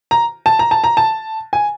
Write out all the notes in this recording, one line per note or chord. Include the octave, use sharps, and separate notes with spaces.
A#5
A5
A#5
A5
A#5
A5
G#5